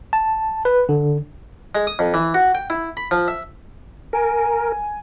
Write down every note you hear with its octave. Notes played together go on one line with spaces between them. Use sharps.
A5
B4
D3
G#3
D#6
F2
E3
F#4
G5
E4
B5
F3
E5
A#4 G#5